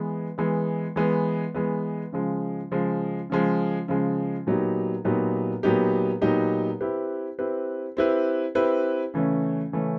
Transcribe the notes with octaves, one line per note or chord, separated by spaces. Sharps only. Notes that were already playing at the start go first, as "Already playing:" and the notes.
Already playing: E3 G#3 B3
E3 G#3 B3
E3 G#3 B3
E3 G#3 B3
C#3 F3 G#3
C#3 F3 G#3
C#3 F3 G#3
C#3 F3 G#3
A#2 F#3 B3 D#4 G4
A#2 F#3 B3 D#4 G4
A#2 F#3 B3 D#4 G4
A#2 F#3 B3 D#4 G4
C4 E4 G4 B4
C4 E4 G4 B4
C4 E4 G4 B4
C4 E4 G4 B4
C#3 E3 A3 C#4
C#3 E3 A3 C#4